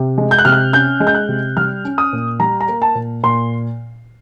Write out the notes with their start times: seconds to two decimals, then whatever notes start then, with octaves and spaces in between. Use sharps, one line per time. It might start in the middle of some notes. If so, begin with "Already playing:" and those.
Already playing: C3
0.18 G#3
0.31 G6
0.38 F#6
0.45 C3 F6
0.52 F#6
0.73 C#4 G6
1.00 G#3
1.07 G6
1.15 F#6
1.28 C3
1.57 G3 F6
1.85 C#4
1.98 D#6
2.13 A#2
2.40 G3 A#5
2.61 A#5
2.68 A#3
2.82 A5
2.95 A#2
3.23 A#2 C6